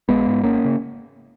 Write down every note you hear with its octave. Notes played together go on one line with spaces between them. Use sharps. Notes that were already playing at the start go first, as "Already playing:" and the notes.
A#1 G#3 B3
G#2
G#1 A#3 C#4
C#3